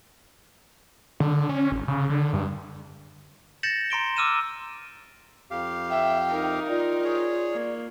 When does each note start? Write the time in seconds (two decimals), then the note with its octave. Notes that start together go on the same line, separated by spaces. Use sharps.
1.20 D3
1.49 C#4
1.72 G#1
1.88 C#3
2.09 D3
2.33 G2
3.63 G6 A6 A#6 C#7 E7 F#7
3.90 A#5 C6 D7 G7
4.16 D6 E6 F6 D#7 E7
5.51 F2 G4 F5
5.90 E5 G5
6.30 D#4 A#4
6.69 F4 D5
7.05 G#4 C#5
7.52 A#3